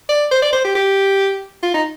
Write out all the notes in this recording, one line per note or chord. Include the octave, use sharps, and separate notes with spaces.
D5
C5
D5
C5
G4
G4
F4
D#4